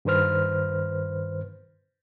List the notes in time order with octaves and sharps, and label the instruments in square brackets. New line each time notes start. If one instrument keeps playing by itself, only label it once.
[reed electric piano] G2 D#3 B4 C5 F6